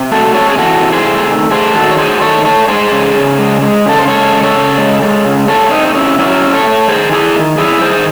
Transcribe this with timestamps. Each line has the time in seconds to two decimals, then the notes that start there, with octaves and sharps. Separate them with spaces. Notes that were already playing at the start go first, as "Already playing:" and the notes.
Already playing: C3
0.11 A3 F#4 A4
0.34 C3 A4 C#5
0.50 G#4
0.58 E3 F#4 A4
0.82 C3
0.92 G#4 C5
1.05 A3
1.28 D#3
1.51 A3 G#4 C5
1.74 D#3 F#4 A4
1.91 C#5
1.98 F#3 G#4 C5
2.21 D#3 A4 C#5
2.45 A3 A4 C#5
2.68 G#3 G#4 C5
2.92 C#3
3.15 C#3
3.38 G#3
3.61 G#3
3.86 C#3 A4
3.99 C5
4.08 G#3 A4 C#5
4.32 C#3
4.43 A4 C#5
4.54 C#3
4.78 G#3
5.02 G#3
5.25 C#3
5.48 C3 A4 C#5
5.71 A3 C4 D#4
5.87 D#4
5.95 C3 C#4 E4
6.18 F#3 C#4 E4
6.41 C3
6.54 A4 C#5
6.66 A3
6.88 D#3 G#4 C5
7.12 A3 E4 G#4
7.35 D#3
7.58 F#3 E4 G#4
7.81 D#3 G#4 C5